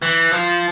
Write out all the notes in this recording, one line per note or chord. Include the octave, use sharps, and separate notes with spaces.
E3
F3